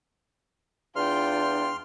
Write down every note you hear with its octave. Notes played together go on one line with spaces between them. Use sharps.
E2 D4 F4 G5 C6 F6